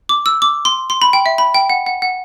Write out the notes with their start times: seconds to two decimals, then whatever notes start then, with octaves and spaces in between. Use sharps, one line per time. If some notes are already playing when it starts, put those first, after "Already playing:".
0.09 D6
0.26 E6
0.42 D6
0.65 C6
0.90 C6
1.02 B5
1.13 G5
1.26 E5
1.38 B5
1.55 G5
1.70 F#5
1.86 F#5
2.02 F#5